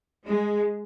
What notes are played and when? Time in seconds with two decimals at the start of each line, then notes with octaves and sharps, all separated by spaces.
0.25 G#3